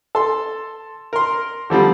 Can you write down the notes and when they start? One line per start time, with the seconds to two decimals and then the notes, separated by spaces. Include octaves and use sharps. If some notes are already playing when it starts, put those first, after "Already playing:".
0.15 A4 C6
1.13 A#4 C6
1.70 D3 F3 G3 C4